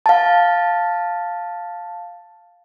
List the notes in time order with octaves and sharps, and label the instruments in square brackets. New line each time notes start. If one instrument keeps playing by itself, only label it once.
[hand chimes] F5 A5